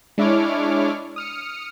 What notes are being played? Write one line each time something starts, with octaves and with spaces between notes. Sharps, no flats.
G#3 D4 E4 C#5 D6 F6
D#6 F6 C#7